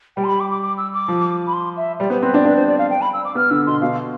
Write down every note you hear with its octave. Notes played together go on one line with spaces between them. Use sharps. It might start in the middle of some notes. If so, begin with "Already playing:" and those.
G3 G5
C6
B5
D6
D6
D6
E6
D6
F3
B5
C6
E5
G3 D5
B3 C5
C4 B4
D4
D4 B4
C5
D5
F5
G5
B5
E6
D6
B3 F6
D3 E6
B2 C6
B2 F5